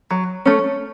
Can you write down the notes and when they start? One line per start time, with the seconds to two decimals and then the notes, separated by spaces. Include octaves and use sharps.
0.11 F#3
0.46 A3 C#4